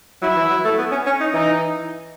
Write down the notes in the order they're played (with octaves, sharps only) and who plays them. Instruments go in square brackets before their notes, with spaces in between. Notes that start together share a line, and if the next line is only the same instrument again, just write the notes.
[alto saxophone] F#3 [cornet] E4
[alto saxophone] E3
F#3
A3
B3
C#4
C#4
D#4
[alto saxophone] E3 [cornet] D#4